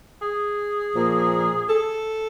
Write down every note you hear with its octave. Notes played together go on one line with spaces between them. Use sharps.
G#4
A#2 F3 A#3
A4